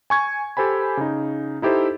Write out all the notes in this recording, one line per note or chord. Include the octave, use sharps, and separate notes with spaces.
G#5 C#6 G#6
G4 A4 C5 G#5 B5
C#3 D#4
D#4 E4 G4 A4 C5